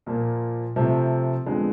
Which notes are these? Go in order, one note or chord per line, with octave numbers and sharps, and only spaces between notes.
A#2 F3 A#3
C3 F3 A3 C4
F2 D3 F3 G#3 B3